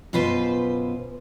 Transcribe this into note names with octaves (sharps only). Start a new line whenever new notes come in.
F#2 B2 F4 B4 C5